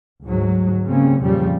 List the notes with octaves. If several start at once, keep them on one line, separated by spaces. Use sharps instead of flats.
D2 G#2 F#3
C#3 G3 A#3 C4 C#4
F2 A#2 C#3 F3 G3